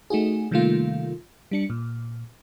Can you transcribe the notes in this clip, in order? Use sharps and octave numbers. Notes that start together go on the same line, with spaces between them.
A3 D#4 F#4 G#4
C3 D#3 G3 A3 A#3 F4
G3 D4 C#7
A#2